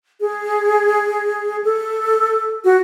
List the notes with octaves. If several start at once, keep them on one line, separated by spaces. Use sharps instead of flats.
G#4
A4
F#4